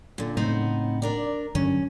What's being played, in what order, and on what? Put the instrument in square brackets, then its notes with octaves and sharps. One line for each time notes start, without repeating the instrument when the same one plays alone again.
[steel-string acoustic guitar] A#2 D3
[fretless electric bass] A2 C#3 [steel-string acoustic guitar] B3 C4 D#4
[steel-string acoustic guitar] D4 A#4 D5
[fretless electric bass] G2 D3 F#3 [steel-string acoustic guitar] C#4